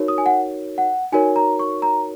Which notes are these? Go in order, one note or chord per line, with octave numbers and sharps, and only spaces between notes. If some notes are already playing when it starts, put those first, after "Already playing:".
Already playing: D#4 F#4 A#4 C#5
D#6
G#5
F#5
F#5
D#4 F#4 A#4 C#5 G#5
A#5
C#6
A#5